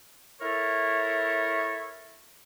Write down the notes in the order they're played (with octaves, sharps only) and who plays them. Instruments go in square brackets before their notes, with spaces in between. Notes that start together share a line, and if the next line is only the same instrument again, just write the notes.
[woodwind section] E4 A4 A#4 C#5